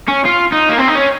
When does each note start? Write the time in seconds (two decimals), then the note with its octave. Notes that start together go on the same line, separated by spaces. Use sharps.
0.08 C#4
0.25 F4
0.52 D#4
0.69 A#3
0.78 C4
0.88 D#4
0.95 C#4